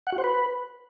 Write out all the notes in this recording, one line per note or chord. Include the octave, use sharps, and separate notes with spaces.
F#5
F#4
C5
B4